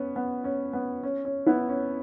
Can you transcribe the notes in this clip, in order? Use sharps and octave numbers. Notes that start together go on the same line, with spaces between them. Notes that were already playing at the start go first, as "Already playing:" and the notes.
Already playing: B3 C#4
B3
C#4
B3
C#4
C#4
B3 E4
C#4